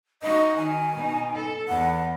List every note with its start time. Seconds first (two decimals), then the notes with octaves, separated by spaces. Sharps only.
0.22 D#4 F#4 D#5
0.56 D#3 G#5
0.95 B2 D#4
1.35 A4
1.68 E2 F#5